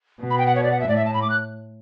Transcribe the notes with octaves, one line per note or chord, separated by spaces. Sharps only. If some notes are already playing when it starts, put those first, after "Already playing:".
B2
B5
G5
F#5
C#5
D5
F#5
E5
A2 D5
E5
A5
B5
D6
F#6